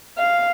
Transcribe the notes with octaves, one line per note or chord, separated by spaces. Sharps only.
F5